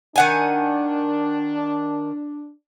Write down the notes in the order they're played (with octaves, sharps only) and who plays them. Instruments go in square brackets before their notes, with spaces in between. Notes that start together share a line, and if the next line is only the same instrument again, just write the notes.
[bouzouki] D#3 F#5 G#5 [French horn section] D4